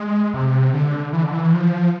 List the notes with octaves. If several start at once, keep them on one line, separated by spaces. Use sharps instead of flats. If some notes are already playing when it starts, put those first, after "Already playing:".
Already playing: G#3
C3
D3
E3
D3
E3
F3